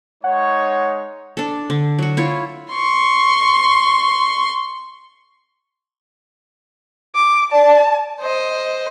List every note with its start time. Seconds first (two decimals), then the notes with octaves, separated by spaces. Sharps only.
0.24 G#3 D#4 C#5 F#5
1.37 D4 A4
1.70 D3
1.99 F#3 F#4
2.17 E4 F4 C#5
2.72 C6 C#6
7.15 D6
7.52 D5 A5
8.21 C5 D#5